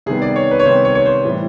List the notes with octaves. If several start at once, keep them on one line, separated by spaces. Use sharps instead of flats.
C3 D#3 G3 B3 G#4
D5
C#5
B4
C#5
C3 D#3 G3 B3 C5
C#5
C#5
C5
A2 E3 G3